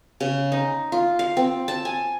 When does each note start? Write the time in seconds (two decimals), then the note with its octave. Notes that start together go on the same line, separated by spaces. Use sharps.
0.20 C#3
0.52 D#4
0.92 F4
1.19 F5
1.37 C4
1.68 A5
1.85 G#5